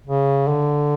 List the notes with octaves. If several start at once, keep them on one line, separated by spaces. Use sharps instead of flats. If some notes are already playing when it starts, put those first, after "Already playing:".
C#3
D3